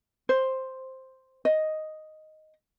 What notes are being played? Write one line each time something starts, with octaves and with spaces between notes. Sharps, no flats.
C5
D#5